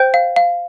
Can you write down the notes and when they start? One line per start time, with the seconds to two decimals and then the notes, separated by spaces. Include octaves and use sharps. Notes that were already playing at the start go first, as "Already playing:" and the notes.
Already playing: C5 G5 G6
0.14 F5
0.36 F5